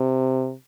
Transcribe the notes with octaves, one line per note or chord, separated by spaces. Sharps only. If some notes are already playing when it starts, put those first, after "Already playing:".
Already playing: C3